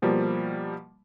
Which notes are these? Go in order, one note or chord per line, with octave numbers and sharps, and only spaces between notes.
B2 F3 G3 A#3